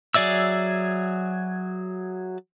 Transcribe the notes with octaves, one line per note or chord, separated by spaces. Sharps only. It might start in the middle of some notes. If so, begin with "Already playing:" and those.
F#3 G#4 D5 E5 E6